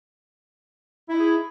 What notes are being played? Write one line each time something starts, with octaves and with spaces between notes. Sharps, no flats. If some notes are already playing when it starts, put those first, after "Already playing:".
D#4 E4 G#4